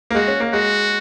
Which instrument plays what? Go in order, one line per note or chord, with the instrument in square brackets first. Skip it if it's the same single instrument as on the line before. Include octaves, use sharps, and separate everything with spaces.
[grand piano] A#3
[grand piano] G#3 [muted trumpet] F#4
[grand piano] C#4
A#3
[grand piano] G#3 [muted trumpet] F#4